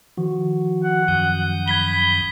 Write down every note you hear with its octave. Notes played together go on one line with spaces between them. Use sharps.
D#3 F3 F#4
F#5
F#2 D#6 G6
B5 G#6 B6 G7